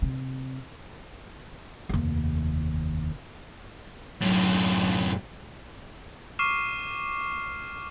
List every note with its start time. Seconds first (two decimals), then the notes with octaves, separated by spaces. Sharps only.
0.02 C3
1.89 F1 D#2
4.21 F#2 A2
6.39 C#6 D6 F6 C7 D#7 E7